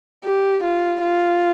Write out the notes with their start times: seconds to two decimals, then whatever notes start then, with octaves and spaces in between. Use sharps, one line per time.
0.24 G4
0.64 F4
1.02 F4